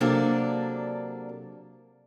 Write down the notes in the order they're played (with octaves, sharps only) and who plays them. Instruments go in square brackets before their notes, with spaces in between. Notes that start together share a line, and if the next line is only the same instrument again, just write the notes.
[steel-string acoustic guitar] C3 F#3 A#3 D4 A4 D5